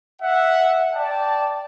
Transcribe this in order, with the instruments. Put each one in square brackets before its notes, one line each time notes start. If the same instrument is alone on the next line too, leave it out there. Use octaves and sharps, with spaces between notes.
[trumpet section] E5 F#5
D5 G5 A5